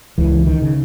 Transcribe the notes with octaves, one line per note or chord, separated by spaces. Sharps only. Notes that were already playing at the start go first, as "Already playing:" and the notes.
C#2 E3
D#3
C#3